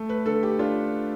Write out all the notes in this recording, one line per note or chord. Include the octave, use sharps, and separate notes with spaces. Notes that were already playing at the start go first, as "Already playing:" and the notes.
Already playing: A3
B4
D3 A4
G4
D4 F4